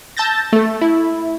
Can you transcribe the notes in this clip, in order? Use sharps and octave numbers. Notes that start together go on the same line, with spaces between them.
A5 E6 G6 A6 A#6
A3 A4
E4